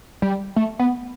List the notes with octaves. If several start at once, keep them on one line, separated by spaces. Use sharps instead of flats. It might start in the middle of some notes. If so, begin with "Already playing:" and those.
G3
A3
B3